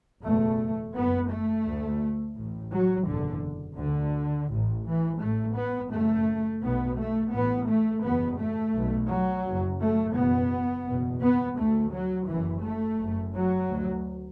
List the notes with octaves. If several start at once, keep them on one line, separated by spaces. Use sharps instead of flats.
F#1 E2 B2 A3
F#1 F#2 B3
A3
D2
A1 A2
F#3
F#1 E2 B2 D3
D2 D3
A1 A2
E3
A1 A2 A3
B3
F#1 F#2 A3
B1 B2 B3
A3
A1 A2 B3
A3
F#1 E2 B2 B3
A3
B1 B2
F#3
F#1 F#2
A3
F#1 E2 B2 B3
F#1 E2 B2
B3
D2 A3
F#3
F#1 F#2 E3
A3
F#1 F#2
F#3
D2